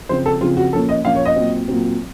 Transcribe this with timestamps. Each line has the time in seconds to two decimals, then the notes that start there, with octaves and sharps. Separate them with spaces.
0.09 C#3 F3 C4 C5
0.26 A4
0.41 C#3 F3 C4 F4
0.57 F#4
0.73 A#2 F3 A#3 C#4 A4
0.89 D#5
1.04 A#2 F3 A#3 C#4 F5
1.15 C#5
1.25 D#5
1.36 A#2 F#3 C4
1.68 A#2 F#3 C4